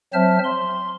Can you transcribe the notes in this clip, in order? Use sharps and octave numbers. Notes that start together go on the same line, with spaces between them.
F#3 C4 C5 E5 A5 F6
C6